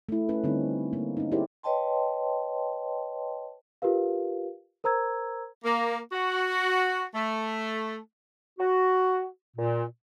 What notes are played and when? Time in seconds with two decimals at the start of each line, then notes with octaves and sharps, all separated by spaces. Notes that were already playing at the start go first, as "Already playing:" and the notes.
0.09 A3 E4
0.29 A3 C#4 B4
0.44 D3 G3 C4 D#4
0.93 A#3
1.17 C#4 D#4
1.32 E4 G4 G#4 A#4 C5 D5
1.63 B4 C#5 D#5 G5 A5 C6
3.82 F4 G4 A#4 B4 F5
4.84 A#4 C5 A#5 E6 G#6
5.64 A#3
6.12 F#4
7.14 A3
8.59 F#4
9.57 A#2